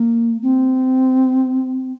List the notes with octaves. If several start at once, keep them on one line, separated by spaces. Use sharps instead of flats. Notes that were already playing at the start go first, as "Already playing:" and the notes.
Already playing: A#3
C4